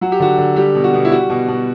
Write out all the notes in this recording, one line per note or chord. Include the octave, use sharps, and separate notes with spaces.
F#3 F#4
G4
D3 F#4
D3
G3 G4
B2
F#4
B2
E4
G3 F#4
B2
B2